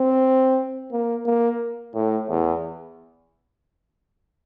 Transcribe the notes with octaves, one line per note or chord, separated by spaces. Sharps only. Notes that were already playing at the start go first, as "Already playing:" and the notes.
Already playing: C4
A#3
A#3
A2
E2